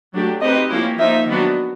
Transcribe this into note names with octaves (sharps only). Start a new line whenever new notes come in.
F#3 A3 D4 G4
A3 C4 D#4 G4 B4 D#5
F3 A#3 C#4 E4 G4
F3 A#3 D#4 E5
D#3 F#3 B3 D4 F#4